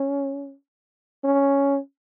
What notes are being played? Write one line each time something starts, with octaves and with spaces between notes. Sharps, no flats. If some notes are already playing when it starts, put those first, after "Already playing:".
Already playing: C#4
C#4